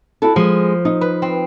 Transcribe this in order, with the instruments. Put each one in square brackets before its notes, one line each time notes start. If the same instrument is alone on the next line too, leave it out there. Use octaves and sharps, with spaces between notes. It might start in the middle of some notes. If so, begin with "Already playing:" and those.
[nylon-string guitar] E4 F#4 A4
[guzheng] F3 [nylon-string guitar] G#3
[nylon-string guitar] D#4
[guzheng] B4
C4